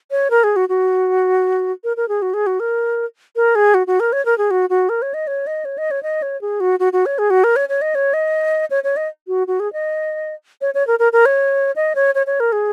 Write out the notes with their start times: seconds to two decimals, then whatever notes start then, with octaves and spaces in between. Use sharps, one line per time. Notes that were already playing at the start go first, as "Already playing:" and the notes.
0.11 C#5
0.31 A#4
0.44 G#4
0.56 F#4
0.69 F#4
1.84 A#4
1.97 A#4
2.09 G#4
2.22 F#4
2.34 G#4
2.47 F#4
2.60 A#4
3.36 A#4
3.55 G#4
3.74 F#4
3.87 F#4
4.00 A#4
4.13 C#5
4.26 A#4
4.38 G#4
4.51 F#4
4.70 F#4
4.89 A#4
5.02 C#5
5.14 D#5
5.27 C#5
5.47 D#5
5.65 C#5
5.78 D#5
5.91 C#5
6.03 D#5
6.22 C#5
6.41 G#4
6.60 F#4
6.80 F#4
6.93 F#4
7.06 C#5
7.18 G#4
7.30 F#4
7.44 A#4
7.56 C#5
7.69 C#5
7.82 D#5
7.95 C#5
8.14 D#5
8.71 C#5
8.84 C#5
8.97 D#5
9.28 F#4
9.47 F#4
9.60 G#4
9.73 D#5
10.61 C#5
10.74 C#5
10.87 A#4
10.99 A#4
11.13 A#4
11.26 C#5
11.76 D#5
11.95 C#5
12.15 C#5
12.27 C#5
12.40 A#4
12.52 G#4